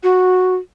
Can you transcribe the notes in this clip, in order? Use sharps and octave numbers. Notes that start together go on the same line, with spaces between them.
F#4